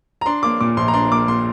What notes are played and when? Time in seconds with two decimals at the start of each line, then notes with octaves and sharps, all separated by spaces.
0.21 A#5
0.26 D4 C6
0.43 A#3 D6
0.60 A#2 D6
0.77 A#1 C6
0.88 A#5
0.94 D4 C6
1.11 A#3 D6
1.28 A#2 C6